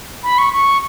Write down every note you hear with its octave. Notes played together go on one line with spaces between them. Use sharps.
B5
C#6
C#6